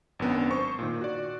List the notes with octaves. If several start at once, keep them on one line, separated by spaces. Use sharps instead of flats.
G#1 F#2 B3 D4
C5 C#6
A#2 D#3
F#4 D5